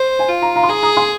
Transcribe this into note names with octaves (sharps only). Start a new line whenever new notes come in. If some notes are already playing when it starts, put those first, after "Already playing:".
Already playing: C5
G#5
F4 F5
F5 A#5
F5 A#5
C6
G#4 A#5 D#6
A#5 D#6
G#5 C6